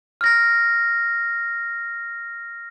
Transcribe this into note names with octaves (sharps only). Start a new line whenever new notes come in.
F6 A#6